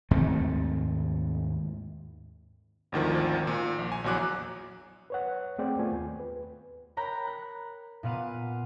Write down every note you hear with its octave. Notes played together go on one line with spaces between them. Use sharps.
D#2 G#2 A3 C4
G#1 D2 D#3 F3
A#2
A#1
G#5
A#1 E2 F#3 D6 F#6
B4 C#5 F#5
A3 C4 G#4 C5 D5 G5
A3 B3 F4 G#5
D#2
B4
A#4 C#5 G5 A#5 B5 F#6
F#6
A#2 B3 B4 F5 F#5 D#7